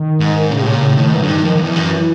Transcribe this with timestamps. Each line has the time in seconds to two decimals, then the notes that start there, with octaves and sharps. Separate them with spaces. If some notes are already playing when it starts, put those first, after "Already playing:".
Already playing: D#3
0.20 G#2
0.51 A2 C#3
0.62 C3
0.66 A#2 C#3
0.82 A2 C#3
0.97 A2 D#3
1.13 G#2 E3
1.22 F#2 D3
1.28 G2 D#3
1.44 F2 D#3
1.56 F2
1.60 E2 E3
1.76 F#2